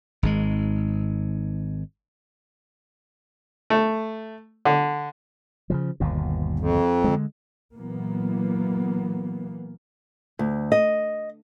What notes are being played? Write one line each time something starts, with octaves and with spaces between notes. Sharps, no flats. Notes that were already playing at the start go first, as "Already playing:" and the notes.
G#1 G#2 G#3
A3
D3
C#3 E3 F3
G1 D#2 B2
F2
D3 G#3
A#2 E3 F#3 A#3 B3
D2
D#5